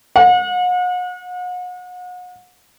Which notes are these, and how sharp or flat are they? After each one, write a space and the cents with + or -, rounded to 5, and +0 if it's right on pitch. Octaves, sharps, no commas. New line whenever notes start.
F#5 -40